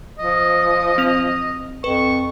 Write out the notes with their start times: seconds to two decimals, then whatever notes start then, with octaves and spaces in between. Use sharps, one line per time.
0.19 F3 D#5
0.98 C4 F7
1.84 F2 B4 C#6